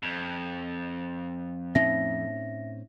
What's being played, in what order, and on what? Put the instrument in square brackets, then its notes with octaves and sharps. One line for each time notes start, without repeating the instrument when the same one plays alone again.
[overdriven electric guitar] F2
[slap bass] A2 C4 C#4 [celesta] D#4 E5 A#6